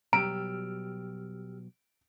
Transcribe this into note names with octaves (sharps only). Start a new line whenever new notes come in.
B2 F#3 G3 G4 A#5 E6 F6 D7